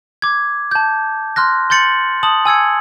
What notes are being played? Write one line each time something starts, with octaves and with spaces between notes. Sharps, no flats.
D6 G#6
A5 G6
C6 F6 F#6 A#6
C6 G6 A6 C#7 F#7
A5 D#6 F#7
G#5 E6 G#6 C#7